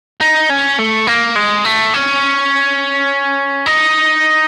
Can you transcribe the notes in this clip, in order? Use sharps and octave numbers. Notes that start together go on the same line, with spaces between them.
D#4
C#4
A3
A#3
G#3
A3
C#4
D#4